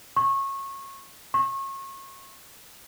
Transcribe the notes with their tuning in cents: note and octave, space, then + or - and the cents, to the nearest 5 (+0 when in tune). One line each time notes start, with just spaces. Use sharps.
C#6 -20
C#6 -30